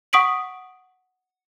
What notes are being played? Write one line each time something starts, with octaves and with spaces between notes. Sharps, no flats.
F#5 C#6 D#6 B6 D7 F#7